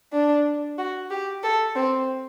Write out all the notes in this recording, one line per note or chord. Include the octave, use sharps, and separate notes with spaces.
D4
F#4
G4
A4
C4